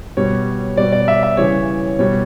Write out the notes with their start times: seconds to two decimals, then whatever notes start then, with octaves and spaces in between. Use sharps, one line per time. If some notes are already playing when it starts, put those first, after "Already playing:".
0.17 B2 G3 C#5
0.77 B2 G3 D5
0.92 D5
1.08 E5
1.23 E5
1.37 C#3 E3 G3 C#5
1.99 B2 G3 C#5